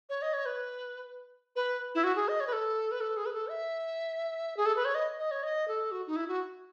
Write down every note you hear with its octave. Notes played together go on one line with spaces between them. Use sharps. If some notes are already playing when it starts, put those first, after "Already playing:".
C#5
D#5
C#5
B4
B4
E4
F#4
G#4
D#5
C#5
B4
A4
B4
A4
G#4
B4
A4
E5
G#4
A4
B4
C#5
D#5
D#5
C#5
D#5
A4
F#4
D#4
E4
F#4